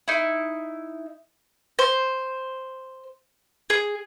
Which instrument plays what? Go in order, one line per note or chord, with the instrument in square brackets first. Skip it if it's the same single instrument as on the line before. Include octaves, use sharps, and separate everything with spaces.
[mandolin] D#4 E4
C5
G#4